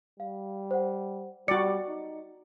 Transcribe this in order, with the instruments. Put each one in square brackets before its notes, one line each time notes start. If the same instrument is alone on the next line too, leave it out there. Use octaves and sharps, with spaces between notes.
[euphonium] G3 [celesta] F5
[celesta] C5 F#5
[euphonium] G3 [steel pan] F#4 D5 [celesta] C#7
[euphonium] D#4